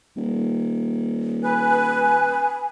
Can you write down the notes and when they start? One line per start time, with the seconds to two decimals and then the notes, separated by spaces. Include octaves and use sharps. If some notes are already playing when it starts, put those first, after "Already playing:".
0.16 D#1
1.44 B4 G#5